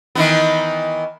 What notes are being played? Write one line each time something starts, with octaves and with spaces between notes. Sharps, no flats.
D#3 E3 B3